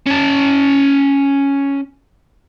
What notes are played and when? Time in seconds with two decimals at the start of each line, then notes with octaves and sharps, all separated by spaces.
0.06 C#4 A5